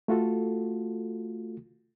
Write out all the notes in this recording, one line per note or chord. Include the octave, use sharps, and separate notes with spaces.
A3 F4 F#4 A4